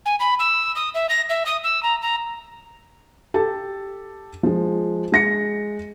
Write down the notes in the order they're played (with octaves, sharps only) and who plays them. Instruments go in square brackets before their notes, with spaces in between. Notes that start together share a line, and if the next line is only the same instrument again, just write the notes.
[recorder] G#5
B5
E6
D#6
E5
A#6
E5
D#6
E6
A#5
A#5
[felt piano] G4 A4 A5
F3 G#3
G#3 A#6 C#7